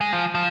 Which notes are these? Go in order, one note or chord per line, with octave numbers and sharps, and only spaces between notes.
G#3
F3
F3